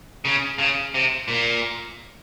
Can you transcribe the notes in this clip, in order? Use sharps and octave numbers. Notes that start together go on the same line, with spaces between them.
C#3
C#3
C3
A#2